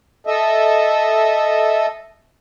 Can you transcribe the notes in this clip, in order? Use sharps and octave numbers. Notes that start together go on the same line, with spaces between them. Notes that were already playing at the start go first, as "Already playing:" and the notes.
A4 D#5 E5